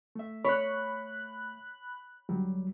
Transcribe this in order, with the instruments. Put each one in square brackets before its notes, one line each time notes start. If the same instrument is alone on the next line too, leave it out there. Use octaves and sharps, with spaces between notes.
[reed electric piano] A3 E5
[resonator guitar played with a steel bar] C#5 [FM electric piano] B5 F#6
[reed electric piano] D2 F#3 G3